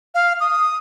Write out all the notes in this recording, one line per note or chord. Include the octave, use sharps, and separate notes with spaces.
F5
D#6